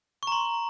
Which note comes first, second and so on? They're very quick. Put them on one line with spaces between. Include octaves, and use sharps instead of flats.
C#6 A#5 C6